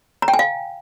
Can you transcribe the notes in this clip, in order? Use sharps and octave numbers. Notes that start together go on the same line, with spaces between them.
A#5
G5
G#5
F5